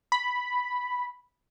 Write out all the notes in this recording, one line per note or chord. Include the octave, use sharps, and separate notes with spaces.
B5